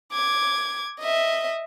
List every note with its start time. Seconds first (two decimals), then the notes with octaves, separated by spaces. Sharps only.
0.13 D6 G#6
1.00 D#5 E5